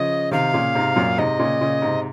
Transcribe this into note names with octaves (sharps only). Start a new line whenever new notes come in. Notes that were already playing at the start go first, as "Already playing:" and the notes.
Already playing: C#3 F3 D#5
C3 D#3 F5
A#2 C#3
G#2 C3
F#2 A#2
G#2 C3 D#5
A#2 C#3
A#2 C#3
G#2 C3